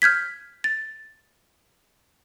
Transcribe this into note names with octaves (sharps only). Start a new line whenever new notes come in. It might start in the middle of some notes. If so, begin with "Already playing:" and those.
F6 G6 G#6 B6
A6